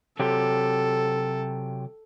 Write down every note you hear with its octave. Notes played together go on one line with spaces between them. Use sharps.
C3 F#3 G4 A4